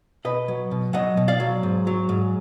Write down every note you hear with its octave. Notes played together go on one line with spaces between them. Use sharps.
B2 B4 D#5
F#3
B2
F#3 D#5 F#5
B2
D5 F5
F#3
G#2
F#3
G#2